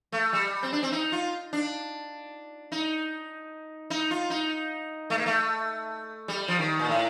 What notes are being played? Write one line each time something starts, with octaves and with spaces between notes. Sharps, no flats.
A3
G3
C4
D4
C4
D#4
F4
D4
D#4
D#4
F4
D#4
A3
A#3
A3
G3
F3
D#3
A#2
A2